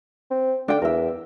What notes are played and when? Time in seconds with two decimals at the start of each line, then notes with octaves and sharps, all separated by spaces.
0.31 C4
0.68 D3 D4 G5
0.82 E2 A#4 E5